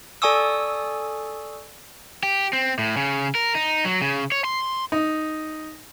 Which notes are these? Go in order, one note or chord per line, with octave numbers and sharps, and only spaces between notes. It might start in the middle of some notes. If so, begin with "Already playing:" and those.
A4 D5 G#5 C#6 D#6 E6
G4
C4
A2
C#3
A#4
D#4
F#3
C#3
C#5
C6
D#4